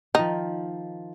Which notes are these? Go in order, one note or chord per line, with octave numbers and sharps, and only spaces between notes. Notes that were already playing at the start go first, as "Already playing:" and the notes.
D#3 F3 D#4